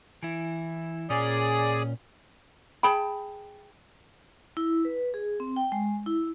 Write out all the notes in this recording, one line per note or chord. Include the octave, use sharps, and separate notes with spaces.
E3 E4
A#2 C#4 G#4 D5 D#6
G#4 G5 A5 B5
E4
B4
G#4
C4
G5
G#3
E4